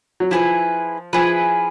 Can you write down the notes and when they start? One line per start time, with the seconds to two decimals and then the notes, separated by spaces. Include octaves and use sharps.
0.20 F#3
0.31 F3 E4 G#4 B4
1.13 F3 E4 G#4 B4